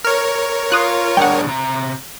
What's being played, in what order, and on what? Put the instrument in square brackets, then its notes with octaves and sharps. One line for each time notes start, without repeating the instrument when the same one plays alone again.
[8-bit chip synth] A#4 C#5 [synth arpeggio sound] F6
[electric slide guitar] F4 [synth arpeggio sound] D#6 F#6
[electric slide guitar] G3 D4 G#4 [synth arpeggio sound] F#5 G5
[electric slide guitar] C3 A#5